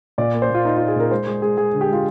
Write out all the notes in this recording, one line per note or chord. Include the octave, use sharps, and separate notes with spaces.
A#2 D5
A#3
C5
A#2 F4
A#3 D#4
F4
A#3
G#4
A#2 A#4
G#3 C5
G#3 G#4
G#3 G#4
G#3 G#4
D3
G4
G#3 F4